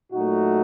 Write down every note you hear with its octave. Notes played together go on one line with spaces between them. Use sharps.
A#2 F#3 A3 D#4 F#4